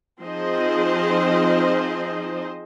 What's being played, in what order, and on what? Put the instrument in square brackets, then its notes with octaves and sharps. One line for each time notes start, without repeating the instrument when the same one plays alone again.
[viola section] F3 C4 D#4 G#4 C5 D#5